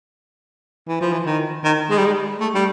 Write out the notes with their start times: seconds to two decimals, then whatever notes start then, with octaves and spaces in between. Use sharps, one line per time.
0.88 E3
1.01 F3
1.13 E3
1.26 D#3
1.64 D#3
1.90 G#3
1.98 G3
2.06 G#3
2.40 A3
2.55 G3